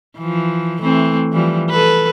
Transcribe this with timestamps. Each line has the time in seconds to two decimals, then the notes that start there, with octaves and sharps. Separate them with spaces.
0.18 E3 F3
0.81 E3 A3 C4
1.33 E3 F3 G3
1.70 A4 B4